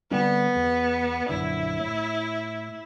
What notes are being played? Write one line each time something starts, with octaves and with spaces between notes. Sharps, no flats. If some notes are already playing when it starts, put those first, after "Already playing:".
D3 G3 B3 C4
E2
A#1 F#2 D3 E4
A2